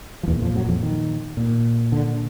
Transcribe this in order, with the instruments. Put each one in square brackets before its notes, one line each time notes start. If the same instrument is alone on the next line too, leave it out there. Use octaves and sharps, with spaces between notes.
[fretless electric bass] F3
E2 A#2 E3
F2 F3
F#2 F#3
F2 F3
D#3
A#2
D3